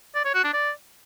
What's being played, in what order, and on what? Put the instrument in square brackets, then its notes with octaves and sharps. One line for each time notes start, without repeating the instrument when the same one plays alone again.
[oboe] D5
C#5
F#4
D4
D5